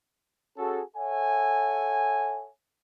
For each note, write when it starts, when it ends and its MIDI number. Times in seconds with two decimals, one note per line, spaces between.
0.58 0.82 61
0.58 0.82 66
0.58 0.82 68
0.58 0.82 69
0.97 2.49 69
0.97 2.49 73
0.97 2.49 76
0.97 2.49 78
0.97 2.49 80